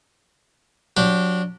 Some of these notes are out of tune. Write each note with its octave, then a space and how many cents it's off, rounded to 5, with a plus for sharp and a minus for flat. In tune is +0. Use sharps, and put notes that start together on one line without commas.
F#3 -30 D4 -15 G4 -15